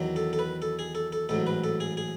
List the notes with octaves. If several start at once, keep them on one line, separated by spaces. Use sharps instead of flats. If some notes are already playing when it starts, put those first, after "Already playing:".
Already playing: E2 D#3 F#3
A4
A4
B4
A4
G#4
A4
A4
A1 G#2 F#3 A4
B4
A4
G#4
G#4